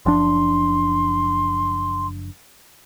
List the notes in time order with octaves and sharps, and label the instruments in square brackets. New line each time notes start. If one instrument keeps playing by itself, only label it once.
[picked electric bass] F#1 F3 D4 [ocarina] C6